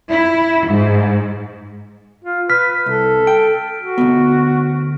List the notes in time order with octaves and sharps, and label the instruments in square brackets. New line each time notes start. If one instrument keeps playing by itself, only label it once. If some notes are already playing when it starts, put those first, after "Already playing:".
[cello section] E4
G#2
[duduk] F4
[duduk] B4 [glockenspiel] F6 B6
[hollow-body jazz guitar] C2 [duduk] A4
[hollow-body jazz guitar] G5 [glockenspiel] D7
[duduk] F#4
[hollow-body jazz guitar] D2 G#2 B3